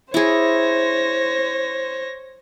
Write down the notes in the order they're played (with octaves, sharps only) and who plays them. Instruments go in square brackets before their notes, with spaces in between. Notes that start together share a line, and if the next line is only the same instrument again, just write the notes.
[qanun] E4 G#4 [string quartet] C5 [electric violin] C#5 A#6